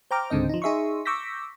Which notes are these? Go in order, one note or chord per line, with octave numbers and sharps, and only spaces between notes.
C5 G5 A#5 D6 F6
C#2 G#2 D3 C4 D#5
F3 D#4
D#4 G#4 E5 C6 C#6
C#6 D6 E6 G6 A#6 B6